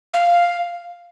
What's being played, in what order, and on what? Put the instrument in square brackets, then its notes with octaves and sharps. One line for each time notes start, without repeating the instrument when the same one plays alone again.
[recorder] F5